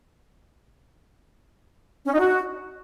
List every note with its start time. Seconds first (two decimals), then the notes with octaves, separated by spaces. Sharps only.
2.05 C#4
2.12 D#4
2.19 F#4